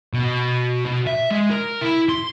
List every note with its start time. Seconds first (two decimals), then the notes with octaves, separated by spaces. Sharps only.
0.13 B2
0.85 B2
1.07 E5
1.31 G#3
1.50 A#4
1.81 E4
2.09 C6